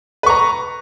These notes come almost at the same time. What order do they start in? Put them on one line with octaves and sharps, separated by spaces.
B4 C#6 A#5